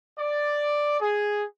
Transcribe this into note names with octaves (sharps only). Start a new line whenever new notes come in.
D5
G#4